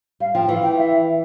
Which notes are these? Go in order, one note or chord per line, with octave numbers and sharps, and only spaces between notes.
G3 F5
F3 G5
E3 F5
G5
E5